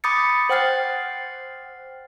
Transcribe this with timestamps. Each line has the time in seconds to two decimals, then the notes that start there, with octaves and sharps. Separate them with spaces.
0.04 B5 D6 D#6 G6 A6 C#7
0.49 C5 F#5 G5 F6 A6 C7